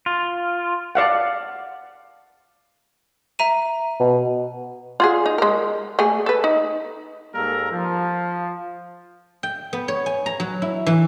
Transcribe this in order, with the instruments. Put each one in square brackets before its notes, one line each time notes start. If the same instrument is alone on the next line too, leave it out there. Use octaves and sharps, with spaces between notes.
[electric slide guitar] F4
[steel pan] D5 F5 F#5
[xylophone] E5 A#5 D#7
[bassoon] B2
[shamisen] F4 F#4 G#4
D#4
G#3 A#4
A3 G#4
A4 B4
D#4
[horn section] G#2 G3 A#3 A4 A#4 A#5
F3
[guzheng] G5
B3
C#5
G#5
A#5
F#3
E4
E3